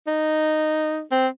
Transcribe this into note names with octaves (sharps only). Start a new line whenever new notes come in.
D#4
C4